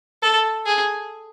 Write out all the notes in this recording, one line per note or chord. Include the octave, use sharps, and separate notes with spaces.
A4
G#4